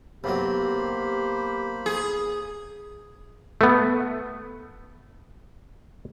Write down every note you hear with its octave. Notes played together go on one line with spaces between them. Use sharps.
B1 C3 F#3 A#3 G4 C5 B5
G#4
A3 B3